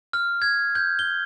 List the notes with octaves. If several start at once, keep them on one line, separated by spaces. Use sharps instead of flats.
F6
G#6
G6
G7